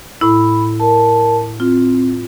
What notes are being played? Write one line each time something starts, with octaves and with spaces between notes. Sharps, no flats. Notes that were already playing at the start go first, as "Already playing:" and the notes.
A2 E4 B5
A#4 A5
C4 F4